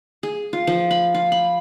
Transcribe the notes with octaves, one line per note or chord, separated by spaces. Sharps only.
G#4
F4
F3
B5
F4
B5